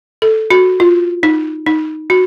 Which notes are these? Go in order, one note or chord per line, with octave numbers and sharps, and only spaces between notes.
A4
F#4
F4
D#4
D#4
F#4